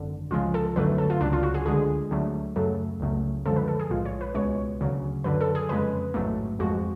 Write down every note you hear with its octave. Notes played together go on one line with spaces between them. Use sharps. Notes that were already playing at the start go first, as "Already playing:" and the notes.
Already playing: G#1 F#2 D3
C#2 C#3 F3 G#3 F4
A4
G#1 F#2 D3 F#3 A3 B4
A4
F4
C#2 C#3 F#3 D4
F4
F#4
G#4
D2 D3 G#3 G#4
D2 D3 F#3 A3
F#2 C#3 F#3 A3 A4
C#2 C#3 F#3 A3
F#2 D3 F3 G#3 A4
B4
A4
G#4
B1 A2 G#3 F4
C#5
B4
C#2 B2 G#3 C#5
D2 C#3 F#3
F#2 D3 F#3 B4
A4
G#4
F2 C#3 G#3 B4
A1 G#2 F#3 A3
F2 F3 G#3 F#4